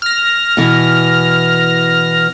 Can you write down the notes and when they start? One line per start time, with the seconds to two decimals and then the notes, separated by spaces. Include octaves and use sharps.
0.02 F6 A#6
0.57 B2 E3